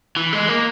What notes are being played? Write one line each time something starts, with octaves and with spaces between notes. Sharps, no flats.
E3
G#3
A#3